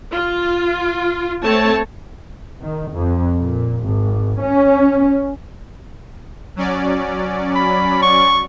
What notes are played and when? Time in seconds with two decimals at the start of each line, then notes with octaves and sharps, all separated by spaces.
0.12 F4
1.44 A3 C4 C#5 A5
2.61 D#3
2.93 F2
3.39 A#2
3.84 G#1
4.42 C#4
6.56 F#3 C#4 D5
7.56 B5
8.03 C#6